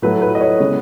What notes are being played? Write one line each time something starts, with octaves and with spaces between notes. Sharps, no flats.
A2 F#3 A3 B4
B4
D#5
C#5
C#3 G#3 B3